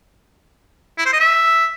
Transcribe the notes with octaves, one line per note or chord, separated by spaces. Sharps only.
E4
C5
D#5
E5